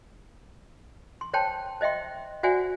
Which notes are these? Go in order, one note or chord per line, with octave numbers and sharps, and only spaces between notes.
C6
C5 C#5 G5 A5 C6
C5 D#5 E5 G5 C6
F#4 C5 D5 E5 F#5 G#5